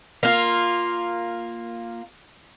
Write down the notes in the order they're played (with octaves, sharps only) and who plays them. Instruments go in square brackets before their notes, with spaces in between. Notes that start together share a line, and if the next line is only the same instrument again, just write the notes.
[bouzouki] A#3 F4